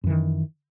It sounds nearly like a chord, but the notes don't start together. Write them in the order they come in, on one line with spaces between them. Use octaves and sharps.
F#2 E3 D#3